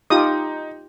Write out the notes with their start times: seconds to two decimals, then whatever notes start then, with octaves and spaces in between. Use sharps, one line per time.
0.10 D#4 F4 G4 D#6